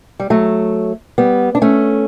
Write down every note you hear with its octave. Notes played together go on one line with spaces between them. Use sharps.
G3
F#3 A3
G3 B3
D4
A3 C#4